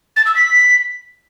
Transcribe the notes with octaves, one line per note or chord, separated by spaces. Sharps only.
A6
E6
B6